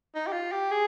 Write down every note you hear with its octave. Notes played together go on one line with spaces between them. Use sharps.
D#4
G4
F4
G4
G#4